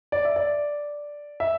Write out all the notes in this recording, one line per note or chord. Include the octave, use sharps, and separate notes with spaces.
D5
E5
D5
E5